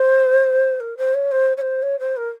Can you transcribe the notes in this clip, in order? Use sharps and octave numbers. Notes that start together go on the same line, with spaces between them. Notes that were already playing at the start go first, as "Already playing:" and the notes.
Already playing: C5
A#4
C5
C#5
C5
C#5
C5
C#5
C5
A#4